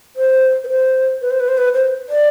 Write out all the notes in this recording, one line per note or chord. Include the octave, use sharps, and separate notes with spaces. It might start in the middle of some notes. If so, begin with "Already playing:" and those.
C5
B4
C5
B4
C5
B4
C5
B4
C5
D5